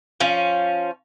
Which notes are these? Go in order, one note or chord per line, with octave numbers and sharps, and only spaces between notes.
F3 C#4